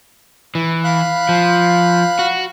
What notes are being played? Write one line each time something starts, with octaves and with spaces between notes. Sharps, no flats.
E3
F5 B5 F#6
F3
F#4